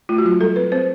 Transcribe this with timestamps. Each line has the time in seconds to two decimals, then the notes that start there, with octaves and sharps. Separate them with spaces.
0.09 A3 F4
0.18 F#4
0.25 F#3 F4
0.40 G3 A4
0.56 C4 B4
0.72 C4 C5